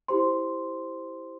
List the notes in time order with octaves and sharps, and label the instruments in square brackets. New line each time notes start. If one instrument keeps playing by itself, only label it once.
[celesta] E4 G4 C5 C6